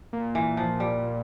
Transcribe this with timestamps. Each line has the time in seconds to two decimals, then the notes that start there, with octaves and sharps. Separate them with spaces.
0.13 A#2
0.35 E3
0.57 F3
0.80 G3